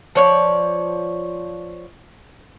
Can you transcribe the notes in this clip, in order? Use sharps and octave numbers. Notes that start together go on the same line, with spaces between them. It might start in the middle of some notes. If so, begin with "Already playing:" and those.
F3 C#5 D5